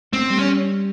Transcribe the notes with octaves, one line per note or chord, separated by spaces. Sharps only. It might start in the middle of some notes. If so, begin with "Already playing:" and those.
A3 C4
G3
C#4